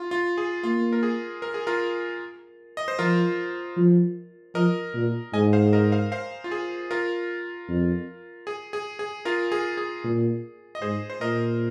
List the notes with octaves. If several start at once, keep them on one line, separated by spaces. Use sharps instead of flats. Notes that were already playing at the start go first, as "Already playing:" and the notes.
Already playing: F4
F4
G#4
A#3 F4
A#4
G#4
A#4
G#4
F4 A#4
D#5
C5
F3 F4 A#4
F3
F3 A#4 D#5
A#2
G#2 D#5 G#5
C5 F5
A#4 D#5
C5 F5
C5 F5
F4
G#4
F4 A#4
F2
G#4
G#4
G#4
F4 A#4
G#4
G#4
A#2
D#5
G#2 G#4 C5
C5
A#2 A#4 D#5